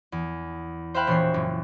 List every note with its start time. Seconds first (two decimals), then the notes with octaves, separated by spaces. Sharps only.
0.12 E2
0.94 C5 E5 F5 G5 B5 F#6
1.07 E1 A#2 E3 C#5 C7
1.34 F#1